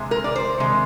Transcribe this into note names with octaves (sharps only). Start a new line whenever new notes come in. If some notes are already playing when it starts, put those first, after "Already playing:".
Already playing: C3 G#3
A#4
D5
C5
C3 D#3 G#3